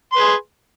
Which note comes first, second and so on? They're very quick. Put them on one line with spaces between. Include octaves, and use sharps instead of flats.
C6 B4 G#4